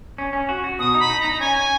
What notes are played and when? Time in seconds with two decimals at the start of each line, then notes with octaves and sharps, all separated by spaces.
0.18 C#4
0.33 C#4
0.49 F#4
0.64 F#4
0.79 B2 D#6
0.94 D#4
1.00 B5
1.10 D#4
1.20 A#5
1.25 D#4
1.32 A#5
1.40 C#4 G#5